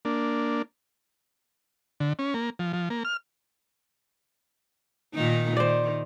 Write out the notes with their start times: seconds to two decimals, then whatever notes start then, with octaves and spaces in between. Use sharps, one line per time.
0.05 A#3 D4
2.00 D3
2.19 C#4
2.34 A#3
2.59 F3
2.73 F3
2.90 A#3
3.05 F6
5.14 A#2 D#3 D#4
5.57 D#3 C5 D5